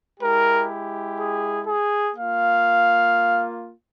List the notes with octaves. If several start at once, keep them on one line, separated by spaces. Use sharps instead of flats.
G#3 E4 G4 A#4
G#4
G#4
A#3 F4 F5